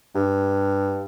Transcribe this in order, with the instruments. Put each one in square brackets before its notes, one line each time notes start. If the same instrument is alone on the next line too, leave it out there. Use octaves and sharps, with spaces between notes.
[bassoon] G2